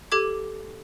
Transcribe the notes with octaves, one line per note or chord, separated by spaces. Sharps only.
G4 A4 D6 G#6